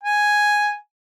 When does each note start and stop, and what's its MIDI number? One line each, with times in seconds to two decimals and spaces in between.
0.03 0.74 80